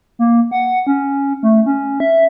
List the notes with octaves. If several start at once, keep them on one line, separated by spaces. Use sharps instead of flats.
A#3
F#5
C#4
A3
C#4
E5